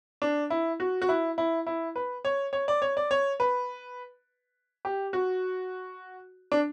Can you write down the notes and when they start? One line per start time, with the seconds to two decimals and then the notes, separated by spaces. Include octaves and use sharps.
0.22 D4
0.50 E4
0.80 F#4
1.02 F#4
1.09 E4
1.38 E4
1.67 E4
1.96 B4
2.25 C#5
2.53 C#5
2.68 D5
2.82 C#5
2.97 D5
3.11 C#5
3.40 B4
4.85 G4
5.13 F#4
6.52 D4